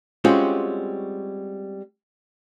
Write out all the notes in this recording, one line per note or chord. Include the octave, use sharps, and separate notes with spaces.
G3 G#3 C4 C#4 F4 F#4